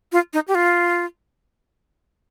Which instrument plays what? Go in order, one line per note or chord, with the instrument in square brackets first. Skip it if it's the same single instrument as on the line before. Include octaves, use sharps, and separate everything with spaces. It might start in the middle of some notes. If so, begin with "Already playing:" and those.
[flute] F4
D#4
G4
F4